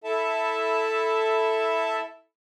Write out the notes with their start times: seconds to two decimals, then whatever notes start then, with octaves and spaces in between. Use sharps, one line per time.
0.04 E4 A4 E5 A5